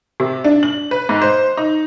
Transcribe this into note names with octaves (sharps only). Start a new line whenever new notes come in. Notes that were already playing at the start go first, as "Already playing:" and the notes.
C3
D4
F#7
B4
G#2
C5
D#4